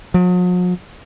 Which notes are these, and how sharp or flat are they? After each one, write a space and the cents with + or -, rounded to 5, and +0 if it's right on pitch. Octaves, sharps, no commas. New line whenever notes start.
F#3 -45